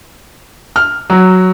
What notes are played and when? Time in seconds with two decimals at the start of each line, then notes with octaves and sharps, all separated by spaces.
0.76 F6
1.10 F#3